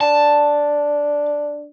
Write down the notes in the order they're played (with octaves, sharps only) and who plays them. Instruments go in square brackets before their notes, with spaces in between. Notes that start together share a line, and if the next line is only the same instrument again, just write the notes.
[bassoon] D4 [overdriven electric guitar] A5